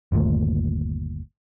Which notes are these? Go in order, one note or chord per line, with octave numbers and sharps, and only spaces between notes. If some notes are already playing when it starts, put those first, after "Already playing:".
G1 D#2 A#2 A3